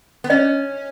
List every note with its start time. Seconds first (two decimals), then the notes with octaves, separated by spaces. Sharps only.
0.24 B3
0.30 C#4 D#5